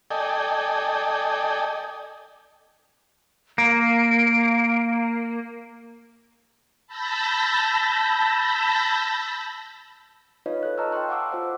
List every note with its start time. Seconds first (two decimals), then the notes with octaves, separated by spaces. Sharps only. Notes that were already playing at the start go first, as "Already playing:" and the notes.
0.11 A4 D5 D#5 G5 G#5
3.58 A#3 D7
6.87 A5 B5 E6 G6 A#6
10.46 D#4 F4 B4 C#5 D#5 F5
10.63 F4 A4 F#6
10.78 D#5 A5 A#5 C#6 E6 F6
10.92 G5 A5 C6 C#6 F#6
11.09 F5 F#5 D6 E6
11.31 F4 C5 F#5